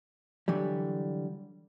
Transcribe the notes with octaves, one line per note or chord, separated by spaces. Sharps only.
D3 E3 F#3 G3